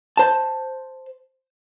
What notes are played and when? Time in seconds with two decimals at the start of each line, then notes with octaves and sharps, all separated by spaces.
0.17 C5 A5